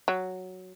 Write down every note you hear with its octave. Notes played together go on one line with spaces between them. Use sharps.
F#3